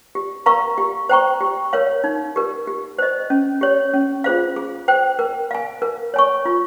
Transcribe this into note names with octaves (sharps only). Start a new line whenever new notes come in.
G4
A#4 F5 A#5 C#6
G4
C5 G5 A#5 C#6
G4
A#4 C#5 F5
D#4
G4 A#4
G4
C5 D#5
C#4
G4 C#5
C#4
F4 G#4 C5 F5
G#4
C5 G5
A#4
F5 G#5
A#4
C#5 G#5 C#6
F4